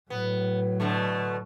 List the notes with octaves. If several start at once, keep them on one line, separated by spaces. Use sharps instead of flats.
A2 F#3 B3
B2 D3 A3